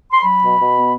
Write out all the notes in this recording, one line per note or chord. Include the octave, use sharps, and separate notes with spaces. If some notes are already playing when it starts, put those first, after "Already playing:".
C6
F#3 B5
B2
B2
B3